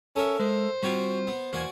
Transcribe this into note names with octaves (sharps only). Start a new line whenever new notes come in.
C#4 A4 A#4 E5
G#3 C5
G3 C4 F4 F#4 C#5 G5
B3
E2 A#3 F#4 D5 G#5